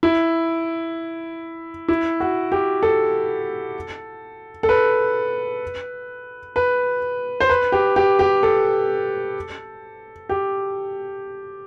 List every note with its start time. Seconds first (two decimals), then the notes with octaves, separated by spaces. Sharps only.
0.03 E4
1.88 E4
2.20 F#4
2.52 G4
2.83 A4
4.63 A4
4.69 B4
6.56 B4
7.40 C5
7.49 B4
7.72 G4
7.96 G4
8.19 G4
8.43 A4
10.29 G4